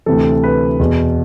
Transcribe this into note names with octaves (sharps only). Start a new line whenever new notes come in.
D2 C3 E3 A4
B4
E2 B2